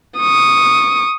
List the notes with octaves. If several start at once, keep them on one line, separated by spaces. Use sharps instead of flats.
C#6 D#6